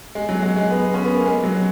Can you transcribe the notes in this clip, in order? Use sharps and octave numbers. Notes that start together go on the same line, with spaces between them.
G#3
F#3
G#3
G#3
B3
C#4
B3
A#3
G#3
F#3